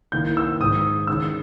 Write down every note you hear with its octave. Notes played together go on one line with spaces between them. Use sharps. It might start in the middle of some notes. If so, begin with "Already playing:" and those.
D#3 A#3 E4 G6
E6
G#2 D#3 G#3 D#6
D#3 G#3 C#4 E6